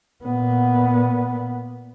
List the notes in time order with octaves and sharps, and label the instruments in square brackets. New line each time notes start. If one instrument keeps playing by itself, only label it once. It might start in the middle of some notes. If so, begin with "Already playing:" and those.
[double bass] A#2 B3